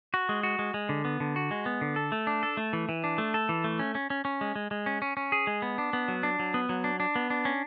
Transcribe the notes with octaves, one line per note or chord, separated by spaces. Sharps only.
F#4
G#3
F#4
G#3
G#3
D3
B3
D3
F#4
G#3
B3
D3
A4
A3
D4
A4
A3
E3
E3
D4
A3
A4
E3
A3
C#4
C#4
C#4
C#4
G#3
G#3
G#3
C#4
C#4
C#4
G#4
G#3
B3
D4
B3
F#3
D4
F#3
B3
F#3
D4
D4
B3
D4
C#4